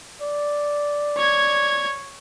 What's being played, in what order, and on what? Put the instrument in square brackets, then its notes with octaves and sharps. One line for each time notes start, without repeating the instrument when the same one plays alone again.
[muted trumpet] D5
[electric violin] C#5 G#6